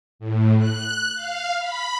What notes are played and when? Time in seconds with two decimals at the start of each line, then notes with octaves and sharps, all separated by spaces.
0.19 A2
0.59 F#6
1.15 F5
1.59 B5